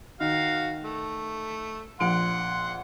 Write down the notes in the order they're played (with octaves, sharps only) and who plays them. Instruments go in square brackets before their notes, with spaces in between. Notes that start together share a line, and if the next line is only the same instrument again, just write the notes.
[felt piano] D#3 [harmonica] F#4 F5
[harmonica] A3
[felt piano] A#1 D7 [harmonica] F#5 C6